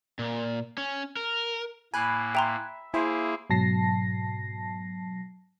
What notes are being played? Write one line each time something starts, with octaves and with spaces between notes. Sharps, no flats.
A#2
C#4
A#4
A2 A#3 G#5 B5 F#6
E5 G5 A#5 C6
A#3 E4 G#4 C5 E5 G#5
G#2 B2 F#3 A5 A#6 C7